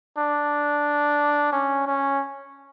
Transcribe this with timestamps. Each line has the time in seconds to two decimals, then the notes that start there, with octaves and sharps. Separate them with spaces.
0.18 D4
1.53 C#4
1.86 C#4